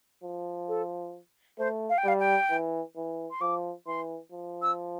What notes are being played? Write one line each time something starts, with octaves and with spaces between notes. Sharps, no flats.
F3
A4
A3 C5
F5
G5
G3 F5
G5
E3
E3
C6
F3 D6
E3 C6
F3
E6